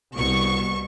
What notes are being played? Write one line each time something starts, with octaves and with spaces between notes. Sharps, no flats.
C2 B2 C#6